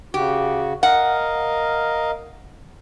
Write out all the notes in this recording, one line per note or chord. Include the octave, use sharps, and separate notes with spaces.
C#3 F#4 G4
A#4 D#5 F5 F#5